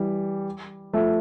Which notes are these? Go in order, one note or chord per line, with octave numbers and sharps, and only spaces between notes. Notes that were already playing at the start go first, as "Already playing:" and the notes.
Already playing: E3 G3
F3 A3